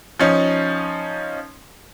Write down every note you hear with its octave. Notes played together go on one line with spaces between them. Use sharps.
F3 C#4 D#4